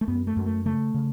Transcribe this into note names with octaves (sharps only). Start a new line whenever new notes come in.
A3
F#2 B3
A3
F#2
A3
C#3 A3
C#3